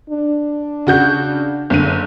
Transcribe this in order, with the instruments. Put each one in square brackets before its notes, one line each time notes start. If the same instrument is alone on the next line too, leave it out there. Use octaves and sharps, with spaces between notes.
[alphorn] D4
[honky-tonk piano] C#3 F#4 G6
F#1 D3 D#7